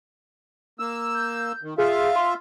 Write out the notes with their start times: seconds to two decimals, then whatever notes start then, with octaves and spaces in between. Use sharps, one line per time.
0.79 A#3 E6
1.14 G6
1.63 D#3
1.78 F4 G#4 E5 F5
2.16 C6